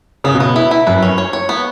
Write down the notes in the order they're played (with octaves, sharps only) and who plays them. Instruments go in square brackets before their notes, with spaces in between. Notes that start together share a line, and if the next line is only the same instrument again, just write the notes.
[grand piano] C#3 [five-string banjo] B3
[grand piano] B2
[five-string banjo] B3
E4
E4
[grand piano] F#2 [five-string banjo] B4
[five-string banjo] C#4
C#5
C#5
B3